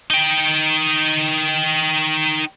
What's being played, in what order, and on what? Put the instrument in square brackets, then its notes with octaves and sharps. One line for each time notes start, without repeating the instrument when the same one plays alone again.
[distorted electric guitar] D#4 G5